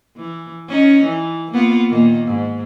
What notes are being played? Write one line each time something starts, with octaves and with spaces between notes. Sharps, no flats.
E3
C#4 D#4
E3
A#3 B3 F4
A#2 D#3 A#3
G#2